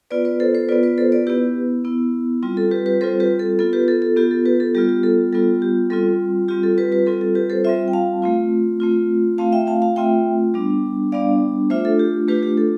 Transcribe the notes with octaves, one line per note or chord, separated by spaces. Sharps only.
B3 F4 B4 D5
B4 D5
A4 C5
A4 C5
B3 F4 B4 D5
B4 D5
A4 C5
B4 D5
B3 E4 G4 B4
B3 E4
G3 C4 F4
A4
G4 B4
G4 B4
G3 C4 F4 A4 C5
G4 B4
A4
B3 F4 A4
G4 B4
A4
A4
B3 F4 G4
A4
G4 B4
A4
G3 B3 F4 G4
G4
A4
G3 B3 F4 A4
G4
G3 C4 F4 A4
G3 C4 F4 G4
A4
G4 B4
G4 B4
G3 C4 F4 A4
A4
G4 B4
A4 C5
G3 C4 F4 C5 E5
G5
F5 A5
A3 C4 F4
A3 C4 F4
A3 C4 F4 F5 A5
E5 G5
F5 A5
F5 A5
A3 C4 F4 E5 G5
G3 B3 D4
G3 B3 D4 D5 F5
A3 D4 F4 C5 E5
A4
G4
A3 D4 F4 G4 B4
G4
A4